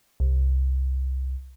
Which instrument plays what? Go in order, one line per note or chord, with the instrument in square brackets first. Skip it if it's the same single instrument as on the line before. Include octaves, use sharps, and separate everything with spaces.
[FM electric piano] C2